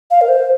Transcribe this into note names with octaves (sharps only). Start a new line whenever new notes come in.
F5
A#4
C5